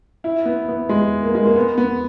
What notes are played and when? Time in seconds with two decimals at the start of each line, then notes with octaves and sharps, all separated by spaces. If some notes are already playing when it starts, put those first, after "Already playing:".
0.24 E4
0.45 B3
0.69 B3
0.89 G#3
1.23 A#3
1.35 G#3
1.46 A#3
1.56 B3
1.78 B3